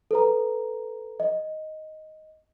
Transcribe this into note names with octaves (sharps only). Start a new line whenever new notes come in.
A4 B4 A#5
D#5